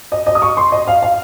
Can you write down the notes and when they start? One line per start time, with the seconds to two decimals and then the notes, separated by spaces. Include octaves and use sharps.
0.12 D#5
0.27 D#5
0.35 D#6
0.42 C#6
0.57 C6
0.72 D#5
0.87 F5
1.02 F5